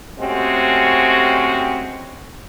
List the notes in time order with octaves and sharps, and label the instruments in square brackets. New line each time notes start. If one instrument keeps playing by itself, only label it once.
[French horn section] G#3 A3 C4 C#4 F#4 G4